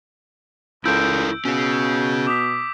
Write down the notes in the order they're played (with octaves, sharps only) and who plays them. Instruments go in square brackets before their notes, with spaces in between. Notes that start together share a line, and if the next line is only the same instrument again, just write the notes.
[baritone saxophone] C#2 [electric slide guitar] E4 A4 A#4 [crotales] E6 G6 D7
[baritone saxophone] B2 [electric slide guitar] C#4 G#4
[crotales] D6 D#6 B6